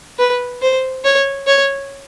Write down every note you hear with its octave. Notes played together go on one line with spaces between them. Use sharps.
B4
C5
C#5
C#5